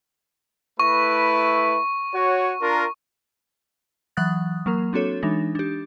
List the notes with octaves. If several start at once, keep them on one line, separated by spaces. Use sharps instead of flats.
A3 E4 B4 C#6
F#4 C#5
D4 F4 A#4
E3 F#3 F#5 D#6 F#6 A6
F#3 A#3 A#4
C4 D4 F#4 A4 C#5
E3 G#3 D4 D#4
D4 G4